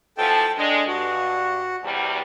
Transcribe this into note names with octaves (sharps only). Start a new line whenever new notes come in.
B2 E3 F3 A4 G5 A5
G#3 D4 D#5
G2 F#4
E2 C3 G3